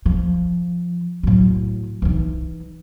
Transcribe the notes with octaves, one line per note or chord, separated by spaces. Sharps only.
F3
A2 F#3
E3 D#4